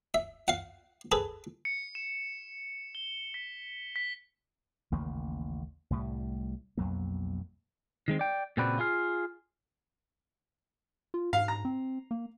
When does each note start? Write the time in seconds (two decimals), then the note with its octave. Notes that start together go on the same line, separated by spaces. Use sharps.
0.14 E5
0.48 F5 F#5
1.12 G#4 A4 B4
1.65 C#7
1.95 E7
2.95 G7
3.34 B6
3.96 B6
4.92 A1 D#2 C#3 A#3
5.90 C2 A2 G3
6.77 B1 F2 F#3 A#3
8.08 D#3 G#3 C4
8.19 D5 G5
8.57 A#2 C#3 C4 F#4 B4 D5
8.79 F4 G#4 F5
11.14 F4
11.33 G#2 F5
11.48 A#5
11.65 C4
12.11 A#3